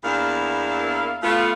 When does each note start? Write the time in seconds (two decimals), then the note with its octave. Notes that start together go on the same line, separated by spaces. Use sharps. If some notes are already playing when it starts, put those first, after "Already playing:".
0.03 E2 A#3 B3 D4 E4 F5
1.23 A3 B3 F4